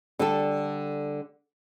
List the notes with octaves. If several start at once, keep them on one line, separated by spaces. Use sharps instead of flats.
D3 G3 A4